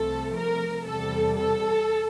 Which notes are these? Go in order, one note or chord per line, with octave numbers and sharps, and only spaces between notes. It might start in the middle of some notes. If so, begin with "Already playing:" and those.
Already playing: C2 C3 F3 A3 A4
A#4
E2 C3 G3 A4
A4